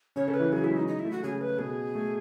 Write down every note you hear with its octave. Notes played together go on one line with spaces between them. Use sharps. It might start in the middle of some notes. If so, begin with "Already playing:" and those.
C#3 C#4 C#5
C#3 C#4 A4
B4
E3 E4
F#3 F#4 G#4
E4
G#3 G#4
D#4
D#4
E4
A3 A4
F#4
C#3 C#4 G#4
B4
B2 B3 G#4
A3